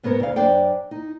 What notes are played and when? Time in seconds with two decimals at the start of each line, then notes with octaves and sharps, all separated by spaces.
0.03 G#2 B3 C#4 A#4 C#5
0.20 D2 F5
0.36 F#2 D4 C5 D5 G5
0.91 D#4